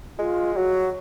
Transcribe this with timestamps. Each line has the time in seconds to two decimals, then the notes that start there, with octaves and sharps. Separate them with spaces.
0.18 G#3 F4
0.56 F#3 F#4